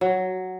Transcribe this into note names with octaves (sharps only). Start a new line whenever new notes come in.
F#3